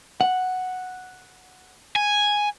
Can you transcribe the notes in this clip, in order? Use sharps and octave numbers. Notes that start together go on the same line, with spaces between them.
F#5
G#5